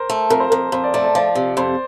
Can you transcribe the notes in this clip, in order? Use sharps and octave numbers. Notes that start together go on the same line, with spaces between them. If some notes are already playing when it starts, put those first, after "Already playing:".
Already playing: A#4 C5
A3
F2 A#4
C5
F2 A#4
F2 C5
D5
A3 D5
D5
F3 D5
C3
F2 C5